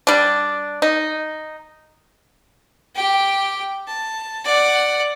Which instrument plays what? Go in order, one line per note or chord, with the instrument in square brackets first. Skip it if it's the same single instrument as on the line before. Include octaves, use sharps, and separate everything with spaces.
[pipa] G3 D4
D#4
[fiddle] G4 G5
A5
D5 F#5